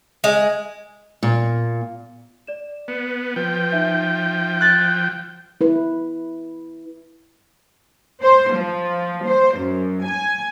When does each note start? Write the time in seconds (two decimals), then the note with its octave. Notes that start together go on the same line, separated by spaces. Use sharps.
0.24 G#3
1.23 A#2
2.47 D5 E7
2.88 B3 C#7 E7
3.36 F3 B4 G5
3.71 D#4 E5 G6
4.61 F#6 A6
5.61 E4 B4
8.22 C5
8.54 F3
9.26 C5
9.57 F#2
10.07 G#5